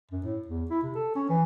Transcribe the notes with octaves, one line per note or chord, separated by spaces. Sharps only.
F#2
A2
E2
E4
C3
A4
C#4
E3